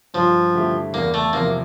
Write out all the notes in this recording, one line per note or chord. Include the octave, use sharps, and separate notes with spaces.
G2 F3
D3 A3 E4 G4
E2 A#3
A3
C3 F3 A#3 C4 E4